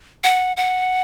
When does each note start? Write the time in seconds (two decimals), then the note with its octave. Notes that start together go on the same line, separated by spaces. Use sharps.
0.24 F#5
0.57 F#5